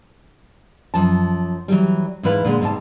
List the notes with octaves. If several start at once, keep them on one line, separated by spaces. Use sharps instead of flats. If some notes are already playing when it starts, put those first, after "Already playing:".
F#2 F3 A5
E3 F#3 G3
G#2 E3 E4 B4 F5
A#2 D3 G#3
G#2 C3 B3 A5